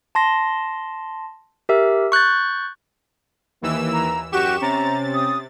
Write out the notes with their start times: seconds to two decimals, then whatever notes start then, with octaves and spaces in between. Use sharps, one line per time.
0.15 A5 C6 A#6
1.69 G4 A#4 E5 E6
2.12 C#6 F#6 G6 A6
3.62 D#2 E3 A#3 E6
3.93 A#5
4.32 F#2 F#4 G4 C#6 E7
4.62 C3 C#4 A#5 A6
5.14 D#6